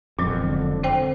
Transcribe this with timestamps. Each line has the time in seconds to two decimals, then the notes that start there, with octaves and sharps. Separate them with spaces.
0.19 E1 F2 A#2 F#3 G#3
0.42 D3
0.83 C4 C5 G5